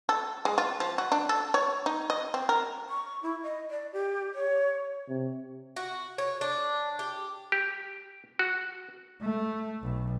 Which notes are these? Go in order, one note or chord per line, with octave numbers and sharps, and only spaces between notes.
A4
G#3
F4
F3
F#4
D4
A4
C#5
D#4
D#5
C4
A#4
C#6
E4
D#5
D5
G4
C#5
C3
F#4
C#5
D4
G4
G4
F#4
A3
B1